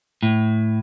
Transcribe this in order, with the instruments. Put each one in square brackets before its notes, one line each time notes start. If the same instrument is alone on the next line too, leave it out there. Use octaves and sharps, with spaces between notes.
[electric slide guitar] A2